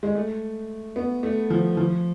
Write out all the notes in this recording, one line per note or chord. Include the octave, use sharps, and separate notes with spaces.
G#3
A3
B3
A3
F3
F3